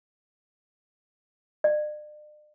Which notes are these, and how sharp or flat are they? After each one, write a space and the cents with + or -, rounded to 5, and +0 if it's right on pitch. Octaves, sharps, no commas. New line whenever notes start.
D5 +45